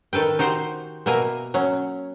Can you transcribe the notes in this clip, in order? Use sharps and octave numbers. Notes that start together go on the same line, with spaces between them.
D#3 A4 B4 G5
D#4 F#4 G4 C5
B2 A#3 A#4 E5 G#5
F#3 C#4